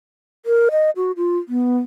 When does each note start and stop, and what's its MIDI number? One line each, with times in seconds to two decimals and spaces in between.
0.46 0.69 70
0.71 0.90 75
0.96 1.12 66
1.17 1.38 65
1.49 1.79 59